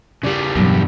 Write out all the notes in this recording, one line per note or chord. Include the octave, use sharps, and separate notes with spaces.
C#3 G3 F4 D5
E2 G2 B2 F3 F#3